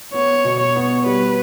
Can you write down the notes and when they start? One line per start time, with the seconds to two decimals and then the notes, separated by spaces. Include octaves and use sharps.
0.14 B3 C#5
0.45 B2
0.60 C#5
0.76 B3
1.06 G3 B4